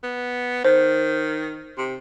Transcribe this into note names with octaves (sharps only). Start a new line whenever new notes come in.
B3
D#3 C5
C3